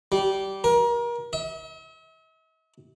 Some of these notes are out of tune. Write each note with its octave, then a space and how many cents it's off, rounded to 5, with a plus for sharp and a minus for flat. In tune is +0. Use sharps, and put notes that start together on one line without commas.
G3 -15
A#4 +30
E5 -45